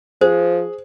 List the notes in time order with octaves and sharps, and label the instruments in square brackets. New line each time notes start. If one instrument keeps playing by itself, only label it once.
[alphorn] F3 [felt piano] G#4 [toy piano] C5